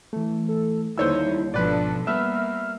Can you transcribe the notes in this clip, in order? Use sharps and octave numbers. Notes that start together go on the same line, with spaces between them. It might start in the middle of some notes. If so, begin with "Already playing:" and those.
E3 A3
A4
D#2 D3 G3 D#4 E4 C5 C#5 E6
G#1 B2 F3 D4 A4 B4 D5
G3 A#3 B3 E5 F6